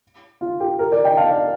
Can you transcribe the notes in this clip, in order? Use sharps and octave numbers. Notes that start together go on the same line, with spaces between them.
F4
G4
G4 A#4
A#4 D5
D#5 G5
F5 A5
D5 F5